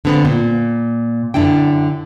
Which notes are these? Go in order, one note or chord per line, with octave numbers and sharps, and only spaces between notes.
D3 B3 C4
A#2
F#2 B2 D3 D4 E4 G5